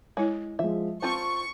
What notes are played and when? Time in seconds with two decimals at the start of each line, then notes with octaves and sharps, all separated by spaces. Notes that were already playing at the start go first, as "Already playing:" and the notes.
0.17 G#3 E4 C#5
0.59 F3 G#3 E5
1.02 C4 F4 C5 A5 C#6